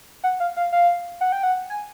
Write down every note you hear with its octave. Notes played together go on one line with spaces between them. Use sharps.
F#5
F5
F5
F5
F#5
G5
F#5
G#5